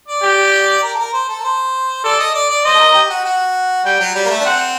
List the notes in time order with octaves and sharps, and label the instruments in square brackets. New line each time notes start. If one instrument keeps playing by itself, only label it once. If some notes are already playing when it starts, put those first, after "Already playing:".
[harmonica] D5
[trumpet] G4
[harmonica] A#4
A4
A#4
C5
A4
A#4
C5
[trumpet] A4 [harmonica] D5
[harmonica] D#5
D5
D5
[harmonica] C5 [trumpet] D#5
[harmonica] A4
A#4
G4
F#4
F#4
[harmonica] G3 [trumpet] G5
[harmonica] F#3
G3
A#3
A3
D4
[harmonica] C4 [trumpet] F#5